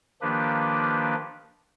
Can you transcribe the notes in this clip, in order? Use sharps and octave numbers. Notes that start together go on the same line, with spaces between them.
D#3 F3 A#3 D4 G4 B4